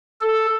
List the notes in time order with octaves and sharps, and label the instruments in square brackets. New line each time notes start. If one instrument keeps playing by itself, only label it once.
[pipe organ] A4